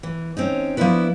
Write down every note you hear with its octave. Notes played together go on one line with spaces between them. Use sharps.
E3
C4 C#4 D#4
F3 A#3 B3 D4 E4 B4